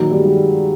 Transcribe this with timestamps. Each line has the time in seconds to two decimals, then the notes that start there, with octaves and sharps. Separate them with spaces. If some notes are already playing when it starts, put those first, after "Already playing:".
Already playing: A#2 D#3 F#3
0.11 D#3 G3
0.19 G#3
0.26 G3